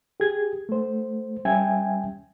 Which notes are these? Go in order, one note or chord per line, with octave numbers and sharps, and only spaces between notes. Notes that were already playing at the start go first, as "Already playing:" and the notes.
G4 G#4 G#6
A3 C5
G3 C#4 E5 G5 G#5 G#6